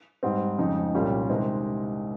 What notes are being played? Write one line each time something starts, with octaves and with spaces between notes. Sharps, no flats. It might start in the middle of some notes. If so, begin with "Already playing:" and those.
G#2 G3 C4
F2 C#3 G#3 D#4
C2 A#2 G3 C#4
C2 C3 D#3 G#3 C4